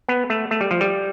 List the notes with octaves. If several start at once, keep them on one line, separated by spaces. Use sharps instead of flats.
B3
A3
A3
G3
F3
G3